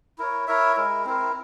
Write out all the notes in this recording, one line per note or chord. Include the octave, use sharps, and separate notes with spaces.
E4 A#4 C#5
E4 A#4 C#5 E5
G#3 E4 A#4
C4 E4 A#4